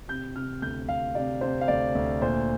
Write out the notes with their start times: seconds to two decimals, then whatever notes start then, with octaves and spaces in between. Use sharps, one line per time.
0.08 C3 G6
0.36 C3 F6
0.62 D2 G6
0.89 D2 F5
1.15 C3 D5
1.41 C3 C5
1.61 F5
1.68 D2 D5
1.95 D2
2.21 A#2 C5